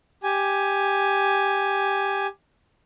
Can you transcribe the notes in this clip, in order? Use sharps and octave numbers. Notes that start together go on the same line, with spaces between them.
G4 G#5